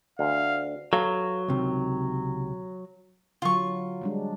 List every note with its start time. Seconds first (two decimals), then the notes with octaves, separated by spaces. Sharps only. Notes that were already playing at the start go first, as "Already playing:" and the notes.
0.19 D2 F5
0.93 F#3 A4 B4 F5
1.48 C#2 C3 D#3
3.42 D3 F#3 F4 C#6
4.02 G3 G#3 D4